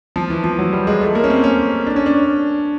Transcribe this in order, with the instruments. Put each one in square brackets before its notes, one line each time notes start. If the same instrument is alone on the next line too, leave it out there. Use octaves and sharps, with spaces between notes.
[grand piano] F3
E3
F3
F#3
G3
G#3
A3
A#3
C#4
C4
C#4
D4
C#4
D4